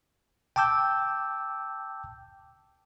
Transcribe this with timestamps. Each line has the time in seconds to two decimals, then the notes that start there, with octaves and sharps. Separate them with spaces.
0.56 G5 A5 D6 E6 G6